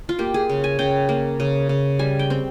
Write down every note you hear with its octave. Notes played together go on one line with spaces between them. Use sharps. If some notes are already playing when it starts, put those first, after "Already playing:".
F4
A#3 G4
G#4
C#3
G#5
C#3 G5
A#3
C#3
C#3
G3 G#5
G5
C4